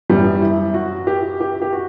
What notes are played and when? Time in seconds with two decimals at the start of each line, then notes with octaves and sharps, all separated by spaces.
0.10 F#2 E3 G3
0.42 E4
0.74 F#4
1.07 G4
1.41 G4
1.62 G4
1.73 F#4